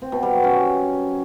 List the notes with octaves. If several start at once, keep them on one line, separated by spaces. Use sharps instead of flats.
C4
B2
G3
F#3
C#4